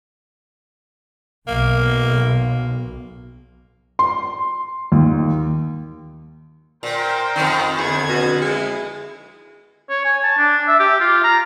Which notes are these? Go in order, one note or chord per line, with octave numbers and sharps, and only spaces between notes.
B1 A#3
C6
D#2
A#2 A#4 C5 G5
F2 D#3 C4
E2 D3 G#6
B2
G#3 E4
C#5
G#5
A5
D4
E5
G4
F4
A#5